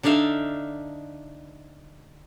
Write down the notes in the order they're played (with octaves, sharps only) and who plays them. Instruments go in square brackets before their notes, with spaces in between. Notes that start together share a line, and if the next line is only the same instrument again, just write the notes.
[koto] D3 D4 D#4 E5 F5